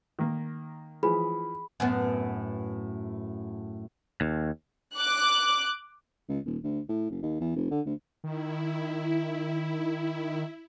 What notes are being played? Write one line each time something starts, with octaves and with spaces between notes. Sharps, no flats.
D#3 A#3
E3 F3 G#4 B5
F#2 A2 B3
D#2
D6 F#6
C#2
D#1
D2
A2
F#1
D#2
E2
F1
D3
D2
D#3 E4